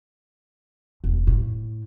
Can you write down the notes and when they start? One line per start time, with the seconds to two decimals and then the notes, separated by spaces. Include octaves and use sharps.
1.04 E1
1.27 A2